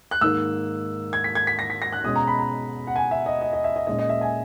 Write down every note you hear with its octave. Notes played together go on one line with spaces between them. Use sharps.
F#6
G#2 D#3 A#3 E6
G#6
B6
G#6
B6
A#6
B6
A#6
F#6
B2 G#3 C#4 D#6
A#5
B5
A#5
F#5
G#5
E5
D#5
D#5
D#5
E5
D#5
A#2 G#3 C#4 D#5
D#5
E5
G#5